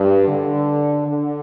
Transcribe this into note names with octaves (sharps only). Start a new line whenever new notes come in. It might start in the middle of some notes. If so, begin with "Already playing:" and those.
Already playing: G2
D3
D3